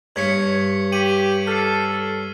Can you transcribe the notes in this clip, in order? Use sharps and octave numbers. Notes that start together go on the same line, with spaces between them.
G2 C#4 G#6 B6 C#7
G4 D#7 F#7
A4 F6 C7